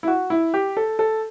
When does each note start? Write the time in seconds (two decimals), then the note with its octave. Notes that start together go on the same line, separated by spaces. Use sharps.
0.03 E4
0.07 F#4
0.30 E4
0.54 G4
0.77 A4
0.99 A4